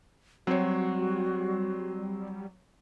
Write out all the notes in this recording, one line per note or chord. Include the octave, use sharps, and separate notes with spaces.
F#3 G3 C4 F#4 C#5